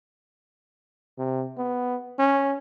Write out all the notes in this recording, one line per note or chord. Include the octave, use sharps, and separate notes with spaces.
C3
B3
C#4